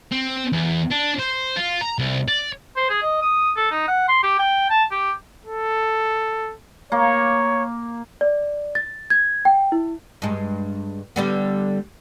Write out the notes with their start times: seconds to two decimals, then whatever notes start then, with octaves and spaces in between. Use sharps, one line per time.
0.11 C4
0.52 E2
0.91 D4
1.19 C5
1.56 F4
1.81 A#5
1.99 C2
2.28 D5
2.76 C5
2.90 G#4
3.02 D#5
3.22 D#6
3.56 A4
3.71 D#4
3.88 F#5
4.08 C6
4.23 G4
4.39 G5
4.70 A5
4.91 G4
5.46 A4
6.92 A#3 C#5
8.21 D5
8.75 A6
9.10 G#6
9.45 G5
9.72 E4
10.22 G2 G#3
11.16 D3 G3 B3